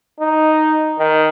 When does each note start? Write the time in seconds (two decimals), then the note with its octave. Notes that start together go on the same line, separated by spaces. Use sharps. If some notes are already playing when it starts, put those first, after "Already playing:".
0.20 D#4
0.99 D#3